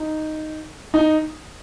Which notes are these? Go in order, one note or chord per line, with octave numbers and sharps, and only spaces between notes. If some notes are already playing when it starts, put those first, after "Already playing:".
Already playing: D#4
D#4